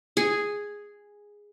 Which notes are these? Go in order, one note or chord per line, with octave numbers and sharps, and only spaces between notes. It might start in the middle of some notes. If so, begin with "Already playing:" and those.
G#4